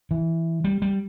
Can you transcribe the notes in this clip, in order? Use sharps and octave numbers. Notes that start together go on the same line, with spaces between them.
E3
G3
G3